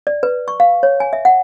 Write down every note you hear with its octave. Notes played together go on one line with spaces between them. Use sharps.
D5
B4
C#6
F5
C#5
G#5
E5
F#5